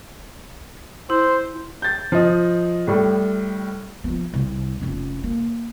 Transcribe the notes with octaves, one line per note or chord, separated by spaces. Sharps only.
E4 C5
G6 A6
F3 D#5
A2 G3
F3 B3
C2
F1 C#4
A#3